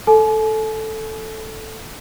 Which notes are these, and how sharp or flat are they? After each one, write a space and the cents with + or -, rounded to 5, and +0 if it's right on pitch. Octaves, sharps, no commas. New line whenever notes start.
A4 +0 G#5 +45